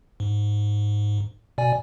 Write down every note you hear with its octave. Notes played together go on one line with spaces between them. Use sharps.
G#2
B2 D5 G#5